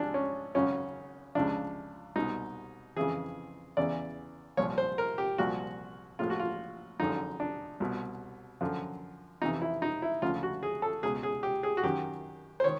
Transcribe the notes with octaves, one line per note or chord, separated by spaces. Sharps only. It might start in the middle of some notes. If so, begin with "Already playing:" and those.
Already playing: G#1 G#2 F3 D4
C#4
G#1 F#2 C#3 C#4
C#2 C#3 F3 D4
C2 B2 D#4
F2 C#3 E3 G#4
E2 C#3 E3 D5
C2 A#2 F3 C#5
C5
A#4
G4
C2 A#2 F3 F#4
A#1 A2 F3 F4
F#4
F4
G#1 F#2 D3 F3 D#4
D4
C2 B2
F#2 D3 F3
F2 C3 E3 D#4
E4
D#4
E4
D2 C#3 F3 F4
F#4
G#4
A4
C#2 B2 G#4
G#4
G4
G#4
F#4
F#2 D#3 G4
C5
D#3 C#5